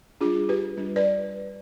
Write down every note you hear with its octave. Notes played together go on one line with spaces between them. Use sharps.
G3 D4 F4 G#4
G4 B4
G3 D4
B4 D5